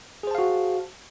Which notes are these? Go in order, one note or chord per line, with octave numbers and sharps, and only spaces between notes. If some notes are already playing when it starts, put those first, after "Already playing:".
F#4 G#4 C5 F5 A5